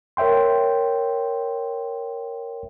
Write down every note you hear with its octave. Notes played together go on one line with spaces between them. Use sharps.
A#4 C#5 E5 G5 C6